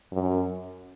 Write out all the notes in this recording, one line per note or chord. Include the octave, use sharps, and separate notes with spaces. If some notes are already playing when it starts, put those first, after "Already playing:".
F#2